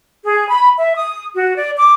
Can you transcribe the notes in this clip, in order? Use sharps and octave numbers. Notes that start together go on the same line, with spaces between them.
G#4
B5
E5
D#6
F#4
D5
D6